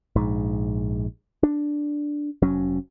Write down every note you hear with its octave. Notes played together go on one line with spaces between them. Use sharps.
A#1 G#2
D4
F1 F#3 C#4